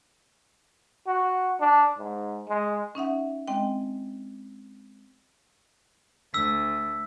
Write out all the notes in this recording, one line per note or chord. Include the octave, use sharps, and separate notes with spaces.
F#4
D4
G#2
G#3
C#4 D#4 E5 F#5
G#3 C4 D#5 G5
D2 E6 B6